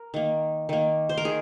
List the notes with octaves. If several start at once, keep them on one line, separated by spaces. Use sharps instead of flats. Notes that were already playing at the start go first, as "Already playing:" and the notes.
Already playing: A#4
D#3 A#3
D#3 A#3
C5
A#4
D#3 G#4